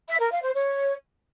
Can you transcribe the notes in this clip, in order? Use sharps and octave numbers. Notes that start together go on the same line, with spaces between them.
E5
A#4
F5
C5
C#5